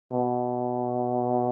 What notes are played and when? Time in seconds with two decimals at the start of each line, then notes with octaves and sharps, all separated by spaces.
0.12 B2